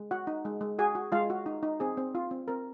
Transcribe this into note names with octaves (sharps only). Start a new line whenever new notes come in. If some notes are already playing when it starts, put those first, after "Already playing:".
Already playing: G#3
F#4 F#5
D#4
G#3
G#3
F#4 G#4 G#5
F#4
G#3 F4 F5
F#4
D#4
D#4
C4 G#4
C4
F4
C4
C4 A#4